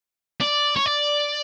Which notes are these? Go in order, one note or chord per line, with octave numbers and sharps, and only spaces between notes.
D5
C#5
D5